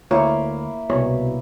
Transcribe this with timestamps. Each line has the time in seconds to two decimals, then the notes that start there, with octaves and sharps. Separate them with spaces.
0.11 D2 A#3 E4 F4 C#5
0.90 C2 B2 C#5